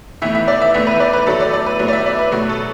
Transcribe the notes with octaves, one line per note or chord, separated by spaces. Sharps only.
A2 E3 B3 E5
E5
D5
E5
A2 E3 B3 E5
B4
D5
B4
A2 F#3 A3 A4
D5
D5
B4
A2 F#3 B3 B4
D5
E5
D5
B4
B2 F#3 A3 F#4
A4